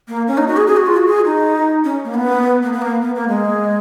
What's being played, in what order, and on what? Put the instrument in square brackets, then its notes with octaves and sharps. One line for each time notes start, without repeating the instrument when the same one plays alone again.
[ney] A#3
C#4
D#4
F#4
G#4
G#4
F#4
F4
F#4
G#4
D#4
C#4
A#3
B3
A#3
B3
A#3
B3
A#3
G#3